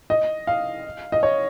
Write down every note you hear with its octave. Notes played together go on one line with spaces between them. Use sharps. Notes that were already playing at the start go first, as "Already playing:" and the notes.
D#5
F5
D#5
C#5